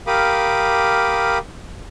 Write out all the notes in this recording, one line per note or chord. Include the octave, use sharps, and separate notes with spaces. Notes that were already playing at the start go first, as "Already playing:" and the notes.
G4 A#4 F5 B5 D6 D#6